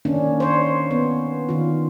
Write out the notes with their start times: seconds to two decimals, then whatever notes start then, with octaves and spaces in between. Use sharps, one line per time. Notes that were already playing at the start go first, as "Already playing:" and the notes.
0.05 D#3 A#3 C#4 D4
0.40 C5 C#5
0.91 B3
1.49 D#3 F4